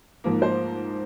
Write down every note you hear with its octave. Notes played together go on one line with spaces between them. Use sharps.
G#2 F3 A#3
C5